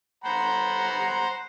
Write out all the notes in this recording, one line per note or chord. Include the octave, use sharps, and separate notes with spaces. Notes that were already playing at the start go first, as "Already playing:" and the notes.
C5 F#5 A#5 B5